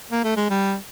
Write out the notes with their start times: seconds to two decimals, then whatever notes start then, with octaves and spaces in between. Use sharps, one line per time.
0.11 A#3
0.24 A3
0.37 G#3
0.50 G3